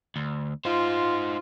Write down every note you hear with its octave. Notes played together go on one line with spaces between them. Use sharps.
D2
D#4 F4 C5